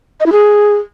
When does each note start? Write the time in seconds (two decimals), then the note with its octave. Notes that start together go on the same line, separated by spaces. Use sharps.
0.20 D#5
0.26 E4
0.32 G#4